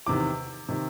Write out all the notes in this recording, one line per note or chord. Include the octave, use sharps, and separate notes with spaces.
E2 C3 D#3 D6
C3 D#3